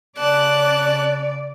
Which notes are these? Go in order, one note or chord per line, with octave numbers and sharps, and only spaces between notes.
C#3 D5 A5 F#6